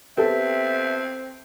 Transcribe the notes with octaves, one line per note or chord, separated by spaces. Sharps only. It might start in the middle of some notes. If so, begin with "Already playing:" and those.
B3 C4 G4 A4 E5